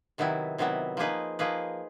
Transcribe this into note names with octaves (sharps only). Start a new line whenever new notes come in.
C3 D#3 F#3 B3 E4
C3 D#3 F#3 B3 E4
F3 A#3 D#4 G#4 B4
F3 A#3 D#4 G#4 B4